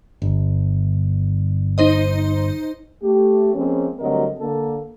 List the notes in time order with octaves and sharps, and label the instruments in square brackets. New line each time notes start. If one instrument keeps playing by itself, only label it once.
[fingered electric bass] G1
[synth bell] D#4 C5 D#5
[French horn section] A3 G4
F3 G#3 A#3 C4 C#4
D2 F#3 G3 C4 A#4 D#5
D3 A#3 A4